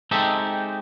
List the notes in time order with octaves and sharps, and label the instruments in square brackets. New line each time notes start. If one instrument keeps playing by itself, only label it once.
[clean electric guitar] G#3 C4 D#4 G4 A4 E5